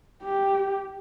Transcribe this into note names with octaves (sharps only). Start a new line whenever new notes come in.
G4